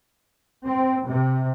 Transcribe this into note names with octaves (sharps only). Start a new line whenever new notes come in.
C4
C3